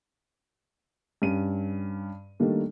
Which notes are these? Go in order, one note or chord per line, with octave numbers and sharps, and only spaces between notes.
G2 C#4 D#7
D#3 G3 A3 A#3 D4